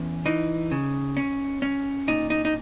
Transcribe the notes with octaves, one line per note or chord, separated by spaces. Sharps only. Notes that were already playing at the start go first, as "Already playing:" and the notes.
Already playing: E2 C#4
E3 D#4
C#3
C#4
C#4
A#2 D#4
D#4
D#4